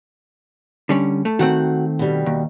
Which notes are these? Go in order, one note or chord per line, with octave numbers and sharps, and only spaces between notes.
D3 G3 C#4
A3
D#3 A3 C4 F#4 F#5
B2 G3
D#2